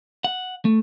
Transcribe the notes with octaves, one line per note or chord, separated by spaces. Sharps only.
F#5
A3